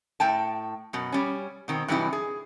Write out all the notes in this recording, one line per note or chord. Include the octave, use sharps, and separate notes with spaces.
A2 G5 A5
F#2 B2
G3 C#4
B2 D#3 C4
G2 C3 E3 F#3 D#4 E4
G#4